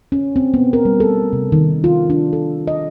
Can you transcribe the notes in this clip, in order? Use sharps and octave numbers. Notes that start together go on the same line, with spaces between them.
C#4
C4
B3
A#4
G3
A4
C3
D#3
F4
D4
A4
D#5